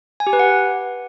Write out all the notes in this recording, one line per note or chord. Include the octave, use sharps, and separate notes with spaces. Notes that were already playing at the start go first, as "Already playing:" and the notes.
G#5
G4
B4
F#5